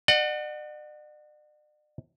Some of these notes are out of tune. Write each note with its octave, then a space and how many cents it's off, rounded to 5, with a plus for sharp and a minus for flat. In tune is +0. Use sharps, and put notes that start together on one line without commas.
D5 +45 F#5 +0